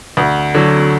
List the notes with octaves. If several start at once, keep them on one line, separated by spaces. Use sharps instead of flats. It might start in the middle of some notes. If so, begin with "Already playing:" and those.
D2
D3 F#3